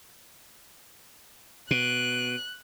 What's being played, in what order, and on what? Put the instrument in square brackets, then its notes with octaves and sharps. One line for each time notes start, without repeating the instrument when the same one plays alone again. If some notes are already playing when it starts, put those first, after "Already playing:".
[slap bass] B2 [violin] F#6